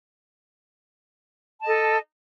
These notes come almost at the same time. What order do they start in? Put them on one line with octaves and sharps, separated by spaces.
A5 D#5 A4